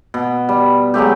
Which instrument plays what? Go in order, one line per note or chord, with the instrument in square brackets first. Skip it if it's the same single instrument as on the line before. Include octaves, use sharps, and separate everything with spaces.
[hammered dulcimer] B2
G3
F#3 G#3 A3 G4